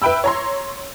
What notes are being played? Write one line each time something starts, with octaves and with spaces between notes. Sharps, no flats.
B4 E5 G5 B5 E6
C#5 A#5 C6